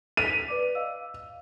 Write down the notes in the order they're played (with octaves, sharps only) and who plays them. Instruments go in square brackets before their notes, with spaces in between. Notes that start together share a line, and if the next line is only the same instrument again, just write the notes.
[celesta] B6 F7 [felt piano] D#7
[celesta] B4 D5 D6
D#5 F5 E6